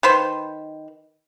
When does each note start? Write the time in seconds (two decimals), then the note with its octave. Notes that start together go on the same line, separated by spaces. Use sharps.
0.03 D#3 B4 C5